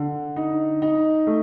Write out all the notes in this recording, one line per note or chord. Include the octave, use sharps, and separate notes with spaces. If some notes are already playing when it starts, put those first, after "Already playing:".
Already playing: D3
D#4
D#4
A3